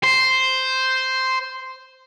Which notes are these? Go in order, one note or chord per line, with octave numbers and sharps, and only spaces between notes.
C5